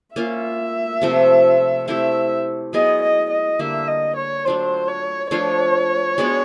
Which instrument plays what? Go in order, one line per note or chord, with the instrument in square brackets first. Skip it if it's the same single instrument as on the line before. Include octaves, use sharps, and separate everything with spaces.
[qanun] A#3 C#4 F4 [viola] E5
[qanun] C3 F3 A3 C4
[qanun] A3 C4 E4 G4 [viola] E5
[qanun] F#3 B3 E4 G#4 [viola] D#5
[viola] D#5
D#5
[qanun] D3 G3 A#3 [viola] E5
[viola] D#5
C#5
[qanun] F#3 A3 D4 F4 [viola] C5
[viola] C#5
[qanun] F3 A3 D4 F4 [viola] C#5
[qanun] G#3 B3 D4 F#4